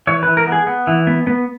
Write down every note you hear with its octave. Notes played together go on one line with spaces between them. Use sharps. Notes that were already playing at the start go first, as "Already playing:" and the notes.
E3 C#5
E3 B4
A#4
B3
G#4
B3
E3
B3
B3